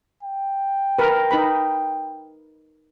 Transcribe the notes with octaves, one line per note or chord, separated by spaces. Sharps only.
G5
A#4 B4
D#4 B4 B5